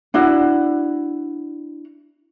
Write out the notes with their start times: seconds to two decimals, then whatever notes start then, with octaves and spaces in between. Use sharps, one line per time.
0.14 D4 E4 F#4